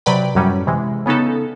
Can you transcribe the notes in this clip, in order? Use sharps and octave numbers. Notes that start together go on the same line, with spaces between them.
C3 F#3 B4 D5 G5 B5
F#2 A2 F#3 G3 C#4
C3 E3 G#3
C#3 B3 C#4 D#4 A4